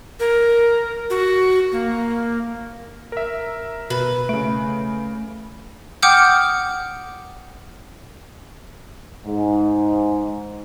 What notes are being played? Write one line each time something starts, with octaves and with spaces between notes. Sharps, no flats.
A#4
F#4
A#3
A#4 E5
B2 B4
C#3 A3 D7
F#5 G5 D6 D#6 F6 G6
G#2